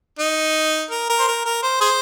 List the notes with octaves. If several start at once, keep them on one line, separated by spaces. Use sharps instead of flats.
D#4
A#4
A#4
C5
A#4
A#4
C5
G#4 C5